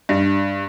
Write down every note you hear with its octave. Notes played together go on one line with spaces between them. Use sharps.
G2